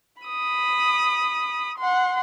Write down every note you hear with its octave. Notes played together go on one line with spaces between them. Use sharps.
B5 D#6
F#5 C6